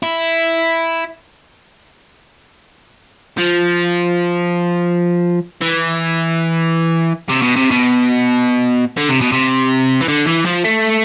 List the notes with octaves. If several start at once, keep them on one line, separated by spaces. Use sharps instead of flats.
E4
F3
E3
C3
B2
C3
B2
D3
C3
B2
C3
E3
D3
E3
F3
A3